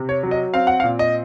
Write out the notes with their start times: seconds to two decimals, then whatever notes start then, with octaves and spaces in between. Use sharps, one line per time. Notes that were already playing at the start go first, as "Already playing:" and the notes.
Already playing: C3
0.09 C#5
0.23 F#3
0.31 D#5
0.54 C4 F5
0.67 F#5
0.80 F5
0.84 A#2
0.99 D#5